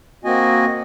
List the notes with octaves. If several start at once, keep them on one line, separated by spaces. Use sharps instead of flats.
A#3 C4 F#4 D#5 G#5